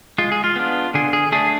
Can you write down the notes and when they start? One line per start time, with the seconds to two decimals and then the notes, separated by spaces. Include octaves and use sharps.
0.18 G#3 F4
0.32 G#4
0.44 F4
0.56 B3 D4
0.94 D3 G#4
1.13 G#4
1.32 A3 D4 G#4